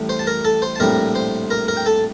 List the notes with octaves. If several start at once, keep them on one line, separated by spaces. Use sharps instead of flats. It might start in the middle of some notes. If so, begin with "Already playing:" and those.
Already playing: A1 A2 G3
C5 C6
A5
A#4 A#5
A4 A5
C5 C6
A5
A#1 A2 G3 C4 A#4 A#5
C5 C6
A#4 A#5
A#4 A#5
G5
A4 A5